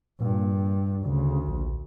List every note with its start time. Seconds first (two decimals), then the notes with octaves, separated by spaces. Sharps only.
0.20 G2 A#2
1.06 D2 C#3
1.48 A#1